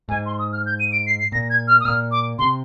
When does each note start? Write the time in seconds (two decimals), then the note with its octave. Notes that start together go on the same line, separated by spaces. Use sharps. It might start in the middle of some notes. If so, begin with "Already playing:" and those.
0.09 G#2 G#5
0.26 C6
0.39 D#6
0.53 F6
0.66 G6
0.80 D#7
0.92 D7
1.06 C7
1.19 C7
1.32 A#2 A#6
1.50 G#6
1.68 F6
1.80 D#6
1.85 A#2 F6
2.12 D6
2.39 C3 C6